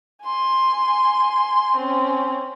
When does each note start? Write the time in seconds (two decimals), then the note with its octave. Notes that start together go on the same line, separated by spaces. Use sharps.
0.24 G#5 C6
1.76 C4 C#4